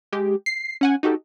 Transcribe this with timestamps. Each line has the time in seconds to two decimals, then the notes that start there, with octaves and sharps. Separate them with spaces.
0.12 G#3 G4
0.46 C7
0.81 C#4 F#5 G#5
1.03 D#4 F#4 G4 A4